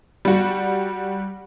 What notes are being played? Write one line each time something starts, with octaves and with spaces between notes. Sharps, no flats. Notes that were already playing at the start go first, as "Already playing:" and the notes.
G3 F#4